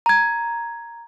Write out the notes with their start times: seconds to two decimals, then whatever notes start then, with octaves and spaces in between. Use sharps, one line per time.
0.06 A#5 G#6